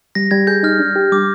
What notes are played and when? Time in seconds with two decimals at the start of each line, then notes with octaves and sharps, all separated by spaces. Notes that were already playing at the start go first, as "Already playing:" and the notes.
0.15 G3 A#6
0.31 G3 G#6
0.47 G#4 G6
0.63 D#4 F6
0.79 D4
0.96 G4
1.12 G3 D6